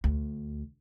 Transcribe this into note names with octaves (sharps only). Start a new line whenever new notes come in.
D2